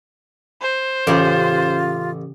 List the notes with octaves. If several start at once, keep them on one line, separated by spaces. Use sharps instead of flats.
C5
A1 C#3 F4 G4